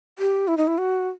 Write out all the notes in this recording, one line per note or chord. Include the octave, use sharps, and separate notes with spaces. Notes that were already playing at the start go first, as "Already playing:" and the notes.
G4
E4
D#4
E4
F#4